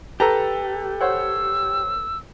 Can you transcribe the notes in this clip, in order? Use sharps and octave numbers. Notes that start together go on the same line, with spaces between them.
G4 A4 B4 A5 A#5
C5 C#5 F#5 E6